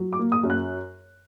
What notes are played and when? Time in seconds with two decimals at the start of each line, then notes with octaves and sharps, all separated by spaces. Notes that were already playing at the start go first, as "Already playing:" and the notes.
Already playing: F#3
0.13 D6
0.19 A#3
0.32 D#6
0.43 F#2
0.50 F#6